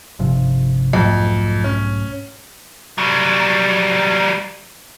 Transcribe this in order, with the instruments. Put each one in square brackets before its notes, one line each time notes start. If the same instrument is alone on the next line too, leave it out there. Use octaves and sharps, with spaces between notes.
[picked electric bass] G1 C3 F3
[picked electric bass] B1 G#2 A3 [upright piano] F2
[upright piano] C#4
[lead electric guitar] F#3 G3